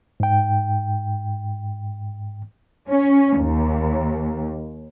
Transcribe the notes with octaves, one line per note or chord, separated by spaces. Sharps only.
G#2 G5
C#4
D#2